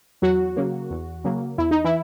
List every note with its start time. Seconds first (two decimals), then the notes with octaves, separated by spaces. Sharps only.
0.22 E2 F#3 F#4
0.56 C#3 F#3 A#3
0.90 E2
1.24 C#3 F#3 A#3
1.58 E2 E4
1.71 D#4
1.84 E3 E4